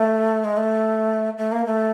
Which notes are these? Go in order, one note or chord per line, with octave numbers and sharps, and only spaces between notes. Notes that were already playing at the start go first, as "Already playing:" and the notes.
Already playing: A3
G#3
A3
A3
A#3
A3